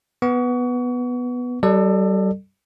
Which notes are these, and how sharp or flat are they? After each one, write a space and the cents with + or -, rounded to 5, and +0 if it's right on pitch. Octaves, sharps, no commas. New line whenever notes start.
B3 +0 C#6 +35
G3 -35 A4 +10 D5 +40